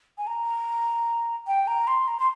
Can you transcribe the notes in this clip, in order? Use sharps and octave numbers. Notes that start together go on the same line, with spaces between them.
G#5
A#5
G5
A#5
C6
A#5
C6